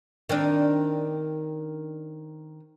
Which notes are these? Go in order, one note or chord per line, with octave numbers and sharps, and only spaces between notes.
D#3 C4 D4